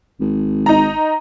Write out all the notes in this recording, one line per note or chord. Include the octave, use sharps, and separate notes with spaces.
G#1
D#4 A#5